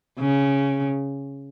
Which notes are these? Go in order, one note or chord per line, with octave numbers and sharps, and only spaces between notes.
C#3